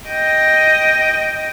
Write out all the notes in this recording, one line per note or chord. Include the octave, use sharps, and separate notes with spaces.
D#5 G5